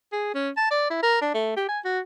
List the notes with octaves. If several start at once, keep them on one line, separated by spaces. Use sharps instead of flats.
G#4
C#4
A5
D5
E4
A#4
D4
A3
G4
G#5
F#4